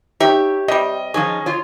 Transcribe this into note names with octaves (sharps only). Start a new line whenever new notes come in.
D#4 G4 C#5 E5
C3 G3 D#5
F3 C#4 D#4 G#4
F4 C#5